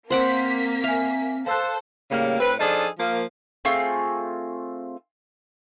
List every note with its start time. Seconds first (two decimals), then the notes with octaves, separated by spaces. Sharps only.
0.10 A#3 C4 C5 F#5 D6 B6
0.84 E5 F5 G#5
1.46 A4 C5 F5 E6 F#6
2.11 A2 C#3 G3 A#3
2.40 A2 C4 B4
2.59 F3 D4 D#4 G#4 A4
2.99 F3 A#3
3.65 A3 C4 F4 G#4